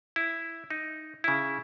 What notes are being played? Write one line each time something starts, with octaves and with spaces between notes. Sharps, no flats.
E4
D#4
C#3 E4